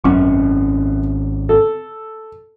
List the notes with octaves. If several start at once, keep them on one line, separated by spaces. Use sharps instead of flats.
G#1 F#2 C#4 C#6
A4